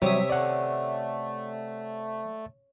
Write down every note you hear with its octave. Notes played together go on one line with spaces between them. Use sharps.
C3 F#3 G3 C#5 E5 D#6
A3 D5 F#5